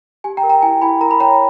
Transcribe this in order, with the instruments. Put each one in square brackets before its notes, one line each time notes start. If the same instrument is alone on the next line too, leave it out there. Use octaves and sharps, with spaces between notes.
[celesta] G4 G#5
G5 A#5
A#4
G5 A#5
E4 G#5
E4 G#5 B5
A#4 A#5
B5
C#5 G5 A#5